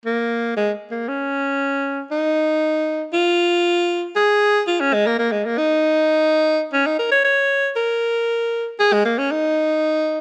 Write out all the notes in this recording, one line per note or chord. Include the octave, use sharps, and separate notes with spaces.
A#3
G#3
A#3
C#4
D#4
F4
G#4
F4
C#4
G#3
A#3
A#3
G#3
A#3
D#4
C#4
D#4
A#4
C#5
C#5
A#4
G#4
G#3
A#3
C#4
D#4